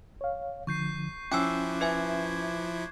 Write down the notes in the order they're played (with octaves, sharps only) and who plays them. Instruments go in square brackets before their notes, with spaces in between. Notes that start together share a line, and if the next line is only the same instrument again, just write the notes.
[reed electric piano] C#5 F5
[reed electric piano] D3 F3 [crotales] C#6 G6 C7
[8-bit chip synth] F3 E4 [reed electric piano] C#4 [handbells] G5 G#5 E6 [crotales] D6 F#6
[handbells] B4 E5 G#5 [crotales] G#6